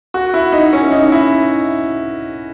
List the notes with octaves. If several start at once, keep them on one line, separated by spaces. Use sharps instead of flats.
F#4
E4
D#4
C#4
D#4
E4